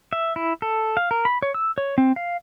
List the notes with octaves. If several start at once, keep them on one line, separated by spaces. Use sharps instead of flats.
E5
E4
A4
F5
A#4
B5
C#5
E6
C#5
C4
F5